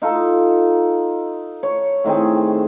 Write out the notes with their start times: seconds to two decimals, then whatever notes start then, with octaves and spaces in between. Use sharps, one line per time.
0.02 D#4 F4 A4
1.63 C#5
2.04 A2 D#3 C4 G#4